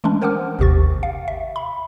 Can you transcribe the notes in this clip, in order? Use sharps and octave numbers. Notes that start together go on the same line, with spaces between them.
E3 G#3 A3 C#4 D4
A#4 C5 F#5 G5 D6 F6
G#1 D#2 C3 G4 C#6 A6
F5
E5
B5